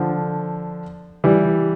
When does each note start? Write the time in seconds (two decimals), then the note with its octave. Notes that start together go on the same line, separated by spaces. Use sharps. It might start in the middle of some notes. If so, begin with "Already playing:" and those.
Already playing: D3 F3
1.24 E3 G3